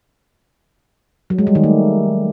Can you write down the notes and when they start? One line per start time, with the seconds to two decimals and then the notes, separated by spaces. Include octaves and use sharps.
1.30 F#3
1.39 G#3
1.47 G3
1.55 D#3
1.63 A3